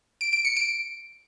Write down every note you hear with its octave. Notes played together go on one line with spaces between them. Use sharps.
D7
D7
C#7
D7